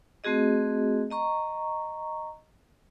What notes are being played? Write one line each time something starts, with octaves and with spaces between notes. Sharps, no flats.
A3 C4 F#4 G#4 D#5
D#5 A#5 C#6